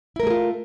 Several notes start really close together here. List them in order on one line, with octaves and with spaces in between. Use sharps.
E4 A#4 A3 G#4 F4